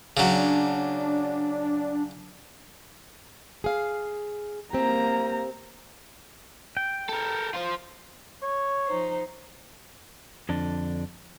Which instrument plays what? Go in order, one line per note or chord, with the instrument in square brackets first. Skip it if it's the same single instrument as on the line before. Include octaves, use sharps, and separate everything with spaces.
[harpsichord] C#3 F#3 [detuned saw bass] D4
[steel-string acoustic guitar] G#4 F5
[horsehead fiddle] A#3 A#5 [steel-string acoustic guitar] C4 G4
[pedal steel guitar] G5
[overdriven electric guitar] A4 A#4
F4 C5
[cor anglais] C#5
[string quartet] F3 D#4 C5
[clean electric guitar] F2 D3 D4